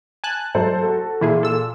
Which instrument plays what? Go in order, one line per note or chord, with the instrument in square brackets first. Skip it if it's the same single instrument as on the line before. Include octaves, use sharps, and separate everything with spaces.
[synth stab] G#5 A5 F#6
[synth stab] G#2 F#3 [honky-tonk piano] A4 C5
[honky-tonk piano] F#4 A4
[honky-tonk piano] A#2 [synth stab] E3 E4 G#4
[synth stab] A4 E6